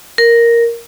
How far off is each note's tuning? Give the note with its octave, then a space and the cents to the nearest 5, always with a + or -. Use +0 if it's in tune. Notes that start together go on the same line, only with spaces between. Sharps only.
A#4 +0